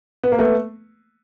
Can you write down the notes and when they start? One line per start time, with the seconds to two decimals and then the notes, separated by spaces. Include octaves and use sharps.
0.23 B3
0.32 A#3
0.38 A3 B3